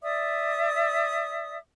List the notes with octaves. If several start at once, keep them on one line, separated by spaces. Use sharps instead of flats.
D5 E5 D#6